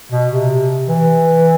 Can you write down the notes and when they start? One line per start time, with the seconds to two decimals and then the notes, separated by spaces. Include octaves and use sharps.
0.12 B2
0.30 C3
0.88 E3